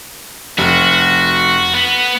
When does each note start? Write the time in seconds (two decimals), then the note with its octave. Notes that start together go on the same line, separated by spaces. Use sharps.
0.58 F1 F#4
1.74 B3